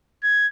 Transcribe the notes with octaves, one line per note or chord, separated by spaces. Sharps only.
G#6